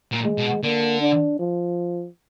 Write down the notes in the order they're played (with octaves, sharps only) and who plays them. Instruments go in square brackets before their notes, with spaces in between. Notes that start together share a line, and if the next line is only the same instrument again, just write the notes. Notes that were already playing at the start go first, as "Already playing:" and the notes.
[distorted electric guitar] A#2
[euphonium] G#3
[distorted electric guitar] B2
[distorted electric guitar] D3 [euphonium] A#3
[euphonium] D4
F3